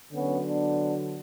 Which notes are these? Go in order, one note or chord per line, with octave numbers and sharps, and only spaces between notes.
D3 F#3 B3 C#4
B3 D4